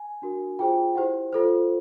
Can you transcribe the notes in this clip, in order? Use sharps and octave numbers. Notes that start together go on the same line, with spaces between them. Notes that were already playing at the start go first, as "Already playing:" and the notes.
Already playing: G#5
D4 F#4 A#4
F4 G#4 C5 G5
E4 G4 C5 F#5
F4 A4 C5